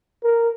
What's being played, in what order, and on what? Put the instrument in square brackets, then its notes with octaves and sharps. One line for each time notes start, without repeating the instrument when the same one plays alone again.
[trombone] A#4